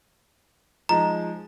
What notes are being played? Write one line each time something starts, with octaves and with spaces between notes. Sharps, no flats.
F3 G#3 D#4 A#5